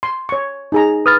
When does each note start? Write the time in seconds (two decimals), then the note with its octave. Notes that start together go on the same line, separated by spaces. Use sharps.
0.03 C6
0.29 C#5 C#6
0.72 D#4 G#4 A#5
1.06 B4 D#6 F6 A6